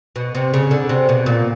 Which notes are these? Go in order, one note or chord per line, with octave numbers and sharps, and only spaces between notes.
B2
C3
C#3
D3
C3
B2
A#2